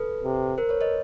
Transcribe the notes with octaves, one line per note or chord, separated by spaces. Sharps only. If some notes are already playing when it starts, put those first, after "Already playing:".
Already playing: A4 B4
C3
A#4 C5
B4 C#5
C#5 D#5